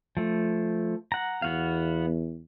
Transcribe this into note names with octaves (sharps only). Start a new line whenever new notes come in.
F3 A3
F#5 A#5
E2 B3 F#4 F5